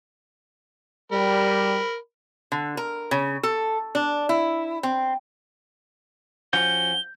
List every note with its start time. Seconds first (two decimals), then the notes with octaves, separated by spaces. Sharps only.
1.12 G3 A#4 B5
2.52 D3
2.77 A#4
3.11 C#3
3.43 A4
3.95 D4
4.29 E4
4.83 C4
6.53 F3 C#4 F#4 G6 G7